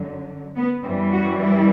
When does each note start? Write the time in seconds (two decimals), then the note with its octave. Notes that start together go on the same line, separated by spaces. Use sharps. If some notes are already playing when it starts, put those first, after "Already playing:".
Already playing: F#2 D3 F#3
0.56 B3
0.84 F#2 E3 G3 C4
1.12 F#4
1.40 E4